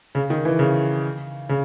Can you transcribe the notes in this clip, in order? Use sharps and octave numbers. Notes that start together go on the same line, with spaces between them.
C#3
D#3
E3
C#3
C#3